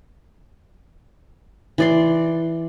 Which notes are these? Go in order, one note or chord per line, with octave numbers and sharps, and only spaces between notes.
E3 D5 C6